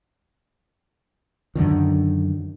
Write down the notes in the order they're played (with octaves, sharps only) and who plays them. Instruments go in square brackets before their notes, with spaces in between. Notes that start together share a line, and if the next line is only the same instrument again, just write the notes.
[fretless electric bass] F#2 D3 D#3